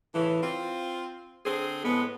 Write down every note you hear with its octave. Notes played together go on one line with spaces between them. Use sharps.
A2 C#3 E3
C4 F4
D3 C4 G#4
A2 G#3 B3